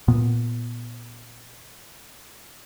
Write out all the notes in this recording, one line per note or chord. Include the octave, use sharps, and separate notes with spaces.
A#2 B3